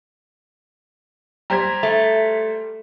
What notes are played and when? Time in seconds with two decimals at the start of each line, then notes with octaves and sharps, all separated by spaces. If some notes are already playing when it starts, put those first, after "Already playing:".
1.50 G3 G4 C5 A#5 G#6
1.83 A3